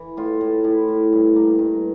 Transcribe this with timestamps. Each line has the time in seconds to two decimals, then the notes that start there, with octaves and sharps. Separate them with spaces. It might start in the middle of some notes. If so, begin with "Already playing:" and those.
Already playing: E3
0.17 A2 F4
0.41 A2
0.64 A2 E4
0.88 A2
1.12 G2
1.36 A#3
1.59 G2